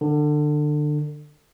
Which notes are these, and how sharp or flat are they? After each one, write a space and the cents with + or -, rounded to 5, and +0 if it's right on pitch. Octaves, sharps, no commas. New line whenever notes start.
D3 +25